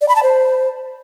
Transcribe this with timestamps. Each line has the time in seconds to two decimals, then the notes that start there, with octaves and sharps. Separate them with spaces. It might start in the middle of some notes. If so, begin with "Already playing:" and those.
0.01 D5
0.08 B5
0.16 A5
0.23 C5